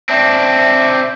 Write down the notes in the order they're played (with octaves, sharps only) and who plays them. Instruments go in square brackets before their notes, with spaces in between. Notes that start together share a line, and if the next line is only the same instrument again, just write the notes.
[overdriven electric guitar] C4 D4 [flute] E5